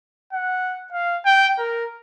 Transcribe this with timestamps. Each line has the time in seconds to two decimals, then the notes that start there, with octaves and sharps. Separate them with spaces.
0.33 F#5
0.93 F5
1.26 G5
1.59 A#4